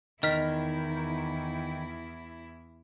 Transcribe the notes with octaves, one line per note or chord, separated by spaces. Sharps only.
E2 D#3 E4 D#5 F6 B6